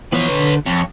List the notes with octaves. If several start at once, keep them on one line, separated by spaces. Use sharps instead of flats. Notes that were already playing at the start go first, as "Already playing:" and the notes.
E3 F3 B3 B4 C#5
D3
F2 C#5